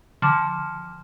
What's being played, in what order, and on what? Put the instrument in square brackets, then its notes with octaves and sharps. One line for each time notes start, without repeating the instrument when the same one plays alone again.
[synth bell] D3 F3